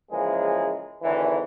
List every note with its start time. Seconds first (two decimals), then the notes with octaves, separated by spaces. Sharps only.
0.11 C#3 E3 F3 G#3 A#3 G#4
1.03 G#1 D3 E3